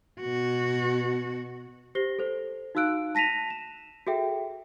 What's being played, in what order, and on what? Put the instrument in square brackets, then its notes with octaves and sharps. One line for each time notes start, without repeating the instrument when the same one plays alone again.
[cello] B2 F#4
[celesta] G4 C5 A#6 C7 G7
A4 C5
D#4 F#4 F5 E6 F#6 D7
A5 A#6 B6 D#7 F7
E7
F#4 G#4 A4 E5 G5